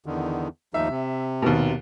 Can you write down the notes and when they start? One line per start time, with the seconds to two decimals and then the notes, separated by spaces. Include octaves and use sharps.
0.06 E2 D3 D#3
0.74 D#2 F3 D#4 E5
0.89 C3
1.42 D#2 B2